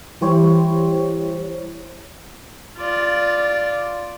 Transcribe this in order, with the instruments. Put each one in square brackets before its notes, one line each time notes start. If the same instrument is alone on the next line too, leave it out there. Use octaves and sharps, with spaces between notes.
[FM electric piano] E3 G3 E4 G4 C5 C#5
[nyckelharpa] F4 D5